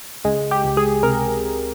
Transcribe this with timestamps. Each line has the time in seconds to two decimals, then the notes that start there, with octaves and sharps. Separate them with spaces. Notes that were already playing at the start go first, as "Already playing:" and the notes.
0.25 C#2 G#3
0.51 G4
0.64 C#2
0.77 G#4
1.03 C3 A#4